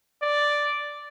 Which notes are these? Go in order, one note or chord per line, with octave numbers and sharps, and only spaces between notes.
D5